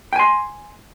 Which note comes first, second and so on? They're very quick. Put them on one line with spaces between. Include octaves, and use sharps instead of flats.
G5 G#5 C6